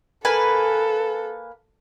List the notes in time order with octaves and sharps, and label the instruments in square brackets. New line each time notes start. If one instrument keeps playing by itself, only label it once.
[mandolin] A#3 B4 G#5 [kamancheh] A4